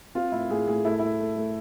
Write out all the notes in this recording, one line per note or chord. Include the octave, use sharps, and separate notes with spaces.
C4 F4
A2 E4
A2 G#4
A2 G#4
A3 E4
A3 E4
A3
A3